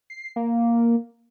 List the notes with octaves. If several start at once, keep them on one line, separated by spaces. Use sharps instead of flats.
C7
A#3